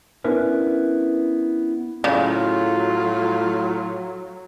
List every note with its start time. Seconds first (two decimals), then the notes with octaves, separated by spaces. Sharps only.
0.24 B3 C#4 D4 E4 A#4 B4
2.04 A2 C#3 F#3 F4